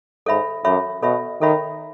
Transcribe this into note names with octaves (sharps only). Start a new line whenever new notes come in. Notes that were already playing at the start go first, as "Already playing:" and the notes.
G#2 A4 C#5 E5 B5
F#2 A4 C#5 E5 B5
B2 A4 C#5 E5 B5
D#3 A4 C#5 E5 B5